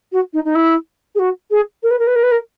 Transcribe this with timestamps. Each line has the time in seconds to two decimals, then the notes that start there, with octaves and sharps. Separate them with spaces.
0.12 F#4
0.33 D#4
0.45 D#4
0.55 E4
1.15 G#4
1.19 F#4
1.51 G#4
1.83 A#4
1.91 B4
1.99 A#4
2.07 B4
2.16 A#4
2.23 B4
2.31 A#4